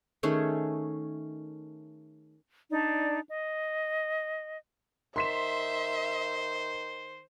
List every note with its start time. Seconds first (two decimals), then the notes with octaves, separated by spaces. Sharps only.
0.23 D#3 A3 C#4 G#4
2.71 D4 D#4 D5
3.29 D#5
5.16 D#3 C5 E5 C6 B6 E7